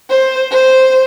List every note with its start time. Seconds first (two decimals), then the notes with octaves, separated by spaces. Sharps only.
0.09 C5
0.51 C5